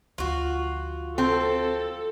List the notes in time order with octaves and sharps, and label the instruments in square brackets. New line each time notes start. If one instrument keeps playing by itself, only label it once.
[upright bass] D2 F3 [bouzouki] F4 F#4
[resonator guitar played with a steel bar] C4 [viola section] A4